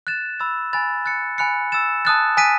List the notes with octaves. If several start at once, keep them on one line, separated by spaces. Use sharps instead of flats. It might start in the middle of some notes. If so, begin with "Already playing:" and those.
F#6 A6 E7
B5 E6 A6
G#5 B5 F#6 A6
F#6 A6 C#7
G#5 B5 F#6 C#7
E6 A6 E7
A5 D#6 F#6 A6
G#5 D#6 F#6 B6 D#7